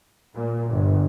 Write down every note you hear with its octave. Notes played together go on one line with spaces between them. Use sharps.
A#2
G1